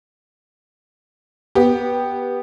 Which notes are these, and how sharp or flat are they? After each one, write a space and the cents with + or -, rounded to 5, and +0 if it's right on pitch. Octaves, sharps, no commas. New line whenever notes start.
B3 -15 G4 +0